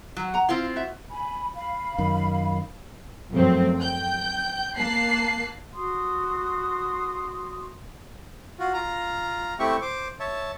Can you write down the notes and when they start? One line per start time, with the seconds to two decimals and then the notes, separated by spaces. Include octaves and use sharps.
0.17 F#3 F#4
0.34 F#5 A#5
0.49 C4 E4 F4 F5
0.76 F#4 E5
1.10 G#5 B5
1.55 F5 B5
1.98 F#2 D#3
3.30 F#2 F3 A3 C4
3.78 G5 G6
4.76 A#3 A5 F#6 C7
5.75 F#4 C6 D#6
8.59 F4 F#4
8.74 F4 A#5
9.59 A3 C4 E4 G4 E5 C#6
9.82 C5 D6
10.20 C#5 E5 A5